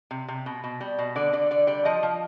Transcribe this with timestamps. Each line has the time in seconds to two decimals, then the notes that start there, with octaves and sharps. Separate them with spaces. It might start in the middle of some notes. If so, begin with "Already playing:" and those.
0.11 C3
0.28 C3
0.46 B2
0.64 B2
0.81 G3
0.98 B2
1.16 D3 D5
1.33 D3 D5
1.51 D3 D5
1.67 G3 D5
1.85 F3 D#5
2.03 F3